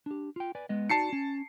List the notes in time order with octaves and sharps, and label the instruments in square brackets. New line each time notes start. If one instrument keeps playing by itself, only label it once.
[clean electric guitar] D4 G4
F4 G5
B4 D5 G#5
G#3 B3 D#5
[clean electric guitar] D#4 F#4 D5 [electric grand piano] A5 C7 C#7
[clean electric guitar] C#4